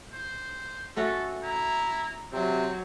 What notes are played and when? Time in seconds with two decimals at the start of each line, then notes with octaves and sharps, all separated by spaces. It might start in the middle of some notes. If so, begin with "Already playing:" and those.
0.13 C5
0.97 A3 C#4 F#4 A4
1.43 E4 A#5
2.33 C3 F#3 C4